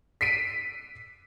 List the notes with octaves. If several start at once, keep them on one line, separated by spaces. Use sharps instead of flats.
B6 C7 D7 D#7